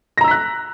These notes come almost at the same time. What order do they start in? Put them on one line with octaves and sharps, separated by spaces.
A#6 A#5 E6 B6 F#6